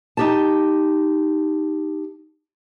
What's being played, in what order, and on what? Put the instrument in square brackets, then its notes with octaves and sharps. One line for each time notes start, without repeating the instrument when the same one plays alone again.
[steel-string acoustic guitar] D#4 G4 A5